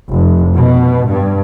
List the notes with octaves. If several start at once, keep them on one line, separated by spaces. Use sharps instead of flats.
F1
B2
G2